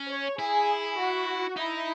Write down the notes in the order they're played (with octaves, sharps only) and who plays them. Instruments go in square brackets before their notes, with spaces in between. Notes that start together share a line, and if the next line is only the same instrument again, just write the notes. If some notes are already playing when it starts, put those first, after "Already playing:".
Already playing: [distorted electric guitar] C#4
[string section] C#5
[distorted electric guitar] E4 [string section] G#4
[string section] F#4
[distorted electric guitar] D#4 [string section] E4